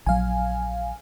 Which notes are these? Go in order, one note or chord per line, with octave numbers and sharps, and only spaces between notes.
A#1 F#3 F5 G#5